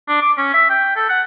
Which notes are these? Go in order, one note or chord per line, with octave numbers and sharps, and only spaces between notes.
D4
D6
C#4
E5
G5
A4
F#5